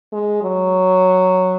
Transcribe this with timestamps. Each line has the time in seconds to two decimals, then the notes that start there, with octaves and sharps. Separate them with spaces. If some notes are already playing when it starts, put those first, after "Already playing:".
0.13 G#3
0.43 F#3